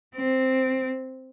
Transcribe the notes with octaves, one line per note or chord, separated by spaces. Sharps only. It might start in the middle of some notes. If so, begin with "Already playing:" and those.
C4